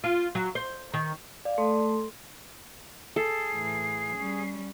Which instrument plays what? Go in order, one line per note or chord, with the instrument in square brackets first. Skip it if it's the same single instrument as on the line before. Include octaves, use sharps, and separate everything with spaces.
[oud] F4
F#3
C5
D#3
[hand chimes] D5 [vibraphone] F5
[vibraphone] A3 [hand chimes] A4 C6
[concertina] G#4 [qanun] A4 [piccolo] C7
[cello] A2 E3
G3 C#4